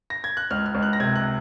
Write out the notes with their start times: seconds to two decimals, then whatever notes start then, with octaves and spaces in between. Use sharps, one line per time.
0.10 A#6
0.24 G#6
0.37 F#6
0.51 C#2 F6
0.66 F6
0.75 C#2
0.83 F#6
0.93 A#6
1.00 C3 G#6
1.15 F#6